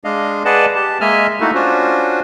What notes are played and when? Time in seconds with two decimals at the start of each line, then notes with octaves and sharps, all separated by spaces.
0.04 G#3 D4 D#5 F5
0.45 G#4 B4 D5 D#5 F#5 A5
0.75 G4 A5
1.01 G#3 A#3 D#5 E5 G#5 F6
1.40 A3 A#3 D#4 E4 F#4 A4
1.54 C#4 D4 F4 F#4 C5